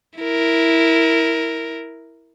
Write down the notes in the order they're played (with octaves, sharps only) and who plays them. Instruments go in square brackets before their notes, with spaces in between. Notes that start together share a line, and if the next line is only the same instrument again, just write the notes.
[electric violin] E4 A#4